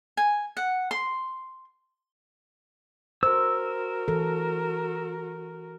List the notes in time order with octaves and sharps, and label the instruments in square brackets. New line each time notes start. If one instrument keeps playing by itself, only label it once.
[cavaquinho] G#5
F#5
C6
[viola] F#4 A#4 [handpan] C5 [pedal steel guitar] E6
[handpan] E3 A4